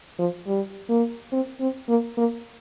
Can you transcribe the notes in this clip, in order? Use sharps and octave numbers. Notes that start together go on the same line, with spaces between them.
F3
G3
A#3
C4
C4
A#3
A#3